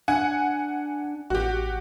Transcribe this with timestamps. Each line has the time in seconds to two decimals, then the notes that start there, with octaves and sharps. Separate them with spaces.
0.08 D4 F#5 G#5
1.30 A1 F#4 G4